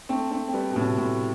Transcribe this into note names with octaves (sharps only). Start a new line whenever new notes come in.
A3 C4
A3 C4
C4
G3 B3
B2
A2 C3
A2